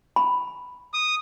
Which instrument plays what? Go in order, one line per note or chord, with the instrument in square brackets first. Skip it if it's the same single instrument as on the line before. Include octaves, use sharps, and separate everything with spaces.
[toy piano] B5
[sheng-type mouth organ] D#6